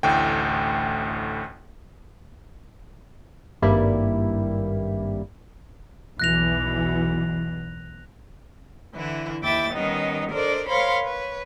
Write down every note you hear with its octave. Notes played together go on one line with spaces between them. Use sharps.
A1 D2 A2 G5
G#1 G2 G3 A#3 E4
B1 E2 B2 E3 F#6 A#6 F7
D3 E3 E4
D#2 E4 E5 G5 D6 A6
D#3 G3 B3 C#4 D#4
D4 A4 A#4 C5 D5 D#5
A#4 C5 C#5 F5 B5 C6
B4 C#5